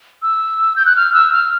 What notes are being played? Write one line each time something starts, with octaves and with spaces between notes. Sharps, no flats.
E6
G6
F#6
F6
E6
F6